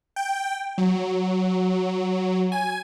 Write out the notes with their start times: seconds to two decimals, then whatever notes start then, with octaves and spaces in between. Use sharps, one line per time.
0.16 G5
0.78 F#3
2.52 G#5